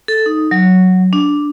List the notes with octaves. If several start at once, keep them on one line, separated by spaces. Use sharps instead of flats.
A4
D#4
F#3
D4